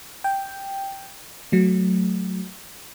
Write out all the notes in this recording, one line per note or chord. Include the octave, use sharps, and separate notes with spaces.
G5
F#3 A3